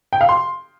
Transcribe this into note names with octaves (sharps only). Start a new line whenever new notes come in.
G5
F5
C6